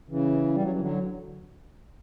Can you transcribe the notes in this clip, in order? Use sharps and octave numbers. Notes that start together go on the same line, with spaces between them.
C#3 E3
G3
F#3
E3
D3 F#3